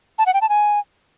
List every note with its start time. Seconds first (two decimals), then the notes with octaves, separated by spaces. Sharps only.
0.19 A5
0.26 F#5
0.34 G5
0.42 A5
0.49 G#5